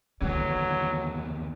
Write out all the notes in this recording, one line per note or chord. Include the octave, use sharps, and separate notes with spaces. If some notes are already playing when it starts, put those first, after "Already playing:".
D#2 D3 E3 F#3